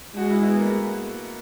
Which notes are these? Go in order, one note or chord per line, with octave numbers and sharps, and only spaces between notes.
G#3 F#4
E4
B3
A#3
A3